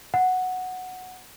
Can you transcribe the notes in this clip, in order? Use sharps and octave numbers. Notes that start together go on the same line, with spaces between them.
F#5